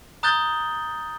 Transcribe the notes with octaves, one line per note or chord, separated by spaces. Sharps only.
A#5 D#6 F#6 G6 A6 G7